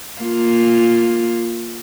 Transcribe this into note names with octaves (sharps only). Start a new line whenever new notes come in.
A#3 F4